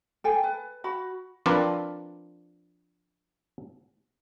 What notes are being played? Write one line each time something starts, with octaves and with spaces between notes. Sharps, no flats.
A4 G5 G#5
B4
F#4 B5
F3 C4 D4 A#4 B4 D5